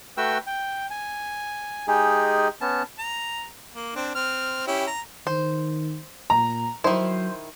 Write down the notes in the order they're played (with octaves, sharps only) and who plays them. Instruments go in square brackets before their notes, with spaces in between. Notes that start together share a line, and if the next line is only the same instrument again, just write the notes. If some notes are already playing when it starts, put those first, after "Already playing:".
[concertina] A3 F#4 B4 G5 E6
G5
G#5
G#3 D#4 G4 G#4
B3 C#4 A5
[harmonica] A#5
A#3
C4 D4
C4 F6
C#4 E4 G4
A#5
[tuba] D#3 [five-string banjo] C5
[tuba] A#2 [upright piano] A#5
[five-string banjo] D#3 E4 [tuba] F#3 [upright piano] C5